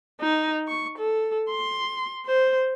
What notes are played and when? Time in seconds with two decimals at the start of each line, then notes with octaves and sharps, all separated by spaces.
0.20 D#4
0.67 C#6
0.99 A4
1.50 C6
2.26 C5